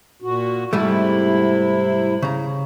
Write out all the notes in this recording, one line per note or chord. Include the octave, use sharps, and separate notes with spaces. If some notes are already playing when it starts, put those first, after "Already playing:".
A#2 F#4
G#2 C3 G3 A3 E4
C#3 A#5